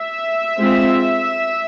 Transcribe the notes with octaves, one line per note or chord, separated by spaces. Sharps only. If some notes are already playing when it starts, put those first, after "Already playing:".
Already playing: E5
G#3 C4 F4